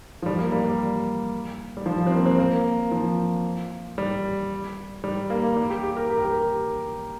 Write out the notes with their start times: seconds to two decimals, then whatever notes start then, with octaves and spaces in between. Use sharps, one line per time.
0.22 F3
0.26 G3
0.39 A#3
0.52 G3
0.65 G3
1.77 G3
1.86 F3
2.07 C4
2.12 A#3
2.26 C4
2.39 A#3
2.91 F3
3.98 G3
5.04 G3
5.30 A#3
5.56 G3
5.70 G4
5.84 G4
5.97 A#4
6.10 G4
6.18 A#4
6.24 G4